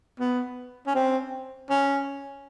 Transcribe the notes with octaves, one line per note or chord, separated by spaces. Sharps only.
B3
C#4
C4
C#4